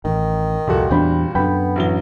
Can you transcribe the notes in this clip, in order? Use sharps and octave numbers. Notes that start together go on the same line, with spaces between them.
A1 D#3
C2 F2 A#2 G3 F#4 A4
E2 C4 D4 G5 B5
F#2 D3 B3 G5 B5
A1 F#3 G7